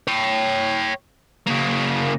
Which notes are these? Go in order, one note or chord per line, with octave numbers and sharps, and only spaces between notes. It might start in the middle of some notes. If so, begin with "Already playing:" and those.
C#5 G5
C#3 A#3